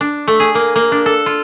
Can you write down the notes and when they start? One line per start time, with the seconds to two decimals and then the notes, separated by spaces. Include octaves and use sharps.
0.01 D4
0.28 A3
0.40 G#4
0.55 A#3
0.76 A#3
0.92 D4
1.06 A4
1.26 F4